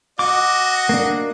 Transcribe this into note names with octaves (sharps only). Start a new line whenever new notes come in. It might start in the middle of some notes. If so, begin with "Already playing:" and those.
F#4 D#5 D6
A#3 D4